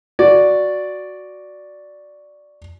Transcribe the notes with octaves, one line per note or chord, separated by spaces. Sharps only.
F#4 D5